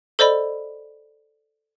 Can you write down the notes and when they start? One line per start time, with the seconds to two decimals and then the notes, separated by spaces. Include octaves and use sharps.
0.19 A4 C5 D5 D#5 B5